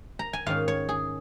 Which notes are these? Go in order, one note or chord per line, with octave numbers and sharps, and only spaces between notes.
A#5
G#5
G#2 D#3 C#4 F5
C#5
G#4